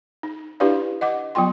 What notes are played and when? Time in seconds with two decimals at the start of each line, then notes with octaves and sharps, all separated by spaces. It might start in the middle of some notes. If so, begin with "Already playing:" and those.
0.23 D#4
0.60 D4 E4 G4 B4 D5 F5
1.01 D#5 F#5 D6
1.35 F#3 B3 F4 G5 C6